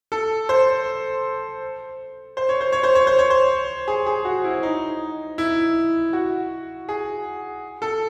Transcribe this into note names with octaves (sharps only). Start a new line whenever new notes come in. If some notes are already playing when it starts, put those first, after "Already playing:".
A4
C5
C5
C#5
C5
C#5
C5
C#5
C5
C#5
C5
G#4
G#4
F#4
E4
D#4
E4
F#4
G#4
A4